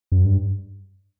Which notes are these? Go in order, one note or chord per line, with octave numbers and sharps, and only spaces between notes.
F#2
G2